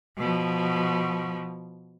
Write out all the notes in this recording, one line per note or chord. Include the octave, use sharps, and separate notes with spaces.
B2 F3